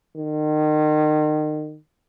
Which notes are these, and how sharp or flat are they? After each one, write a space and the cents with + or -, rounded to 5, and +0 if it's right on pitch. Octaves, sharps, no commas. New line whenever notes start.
D#3 -30